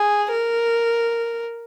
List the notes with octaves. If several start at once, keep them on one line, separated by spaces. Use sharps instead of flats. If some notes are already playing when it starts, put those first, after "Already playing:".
Already playing: G#4
A#4